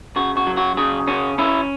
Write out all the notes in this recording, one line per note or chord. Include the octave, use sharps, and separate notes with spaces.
C#3 F#4
F#4
F#3
F#4
C#3 G#4
C#4 F#4
C#4 E4